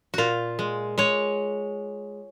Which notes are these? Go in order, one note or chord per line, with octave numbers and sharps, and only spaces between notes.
A#2 F4 F#4
G#3
G#3 C#5